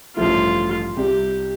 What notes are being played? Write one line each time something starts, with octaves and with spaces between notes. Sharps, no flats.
A1 G2 F3 A3 E4 F4
C2 C3 G3 G4